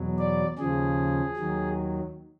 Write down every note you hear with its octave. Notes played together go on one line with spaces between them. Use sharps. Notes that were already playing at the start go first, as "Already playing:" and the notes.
Already playing: E2 B2 F#3
D5
D#2 C#3 F3 G#4
D#2 D#3 F#3